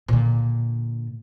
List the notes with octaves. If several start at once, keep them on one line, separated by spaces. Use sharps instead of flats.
A#2 D3